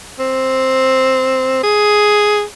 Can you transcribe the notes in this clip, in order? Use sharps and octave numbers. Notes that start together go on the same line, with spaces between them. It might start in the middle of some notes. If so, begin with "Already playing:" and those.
C4
G#4